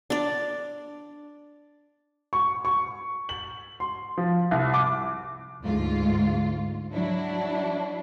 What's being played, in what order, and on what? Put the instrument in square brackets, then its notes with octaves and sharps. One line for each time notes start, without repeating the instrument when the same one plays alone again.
[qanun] D4 D5
[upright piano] C#6
C#6
F#7
C6
F3
C2
D6
[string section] D2 G#2 F4
F#3 D4 E4